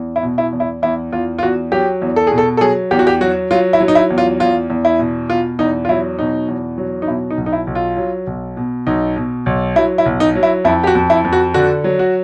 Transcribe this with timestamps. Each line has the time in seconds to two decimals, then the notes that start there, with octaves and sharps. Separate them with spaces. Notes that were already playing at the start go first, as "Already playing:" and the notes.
Already playing: E2
0.16 E4
0.23 B2
0.38 E4
0.53 E2
0.60 E4
0.82 E2 E4
1.12 E2 F4
1.39 F4
1.42 E2 F#4
1.72 F#3 G4
2.02 E2
2.16 A4
2.27 B2 G#4
2.38 A4
2.57 A4
2.61 F#3 G#4
2.91 E2 G4
2.99 F#4
3.07 G4
3.21 F#3 F#4
3.51 F#3 F4
3.73 E4
3.80 F#3
3.88 D#4
3.95 E4
4.10 E2
4.18 F4
4.40 E2 F4
4.70 E2
4.85 E4
4.99 B2
5.29 B2 F4
5.59 E2 D#4
5.85 F4
5.89 F#3 E4
6.19 B2 D#4
6.48 E2
6.78 F#3
7.02 D#4
7.07 B2 E4
7.30 D#4
7.38 B1
7.46 D#4
7.53 E4
7.67 B1
7.75 F4
7.97 F#3
8.27 B1
8.57 B2
8.87 B1 D#4
9.16 B2
9.46 B1
9.76 F#3 E4
9.98 E4
10.06 B1
10.20 D#4
10.35 F#3
10.43 E4
10.65 F2 E4
10.84 G4
10.87 F#4
10.95 F2
11.10 E4
11.25 F2
11.33 F#4
11.54 D3 F#4
11.84 F#3
11.99 F#4